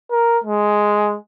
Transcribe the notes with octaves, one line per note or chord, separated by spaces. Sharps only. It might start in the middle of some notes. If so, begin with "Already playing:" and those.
A#4
G#3